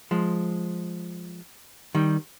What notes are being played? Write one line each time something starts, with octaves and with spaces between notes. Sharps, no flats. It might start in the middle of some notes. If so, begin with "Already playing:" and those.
F3 G#3
D#3 G3